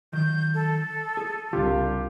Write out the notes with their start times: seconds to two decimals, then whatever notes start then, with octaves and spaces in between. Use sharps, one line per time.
0.13 D#3 F#3 G6
0.54 A4
1.17 G#4
1.53 C2 C#3 D4 F4 G4 F5